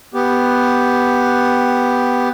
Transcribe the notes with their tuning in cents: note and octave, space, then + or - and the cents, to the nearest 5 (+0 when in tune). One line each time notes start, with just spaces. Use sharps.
B3 +0 G4 +0